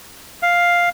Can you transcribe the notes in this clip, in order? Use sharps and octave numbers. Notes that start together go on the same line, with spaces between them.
F5